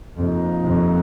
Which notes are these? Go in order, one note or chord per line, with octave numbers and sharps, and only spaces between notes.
F2 C3 F3 A#3 D#4
F2